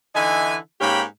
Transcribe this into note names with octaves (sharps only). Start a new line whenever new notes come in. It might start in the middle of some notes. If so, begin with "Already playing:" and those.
D3 E3 D#4 E5 G#5
G#2 A#3 C#4 G4 G5 B5